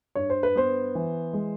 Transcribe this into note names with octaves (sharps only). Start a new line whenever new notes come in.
G2 C#5
C5
B4
B3 C5
E3
G#3